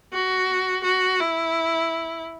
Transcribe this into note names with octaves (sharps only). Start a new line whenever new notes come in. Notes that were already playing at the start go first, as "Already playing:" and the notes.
F#4
F#4
E4